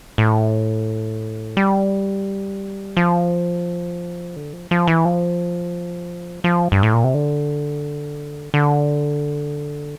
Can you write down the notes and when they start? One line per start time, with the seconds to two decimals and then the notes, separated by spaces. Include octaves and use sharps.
0.18 A2
1.57 G3
2.97 F3
4.36 D3
4.53 F3
4.71 F3
4.87 E3
5.05 F3
6.44 F3
6.72 G2
6.83 A2
6.94 A#2
7.04 C3
7.14 D3
8.54 D3